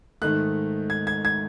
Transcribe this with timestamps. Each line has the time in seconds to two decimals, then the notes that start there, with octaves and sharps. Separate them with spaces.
0.22 G#2 D#3 A3 F#6
0.90 G#6
1.07 G#6
1.25 G#6